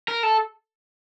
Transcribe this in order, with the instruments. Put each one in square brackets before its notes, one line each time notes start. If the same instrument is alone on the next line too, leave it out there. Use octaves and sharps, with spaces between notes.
[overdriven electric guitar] A#4
A4